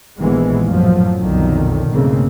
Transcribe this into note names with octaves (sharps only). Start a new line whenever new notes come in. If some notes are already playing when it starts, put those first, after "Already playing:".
A#1 D#2 D#3 E3 G#3 B3
F#2 A2 F3 F#3
B1 F2 D3 D#3
B1 G#2 C#3 A3 A#3 C4